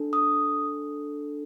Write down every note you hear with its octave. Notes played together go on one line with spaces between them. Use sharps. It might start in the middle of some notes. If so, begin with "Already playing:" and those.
Already playing: D4 A4
D#6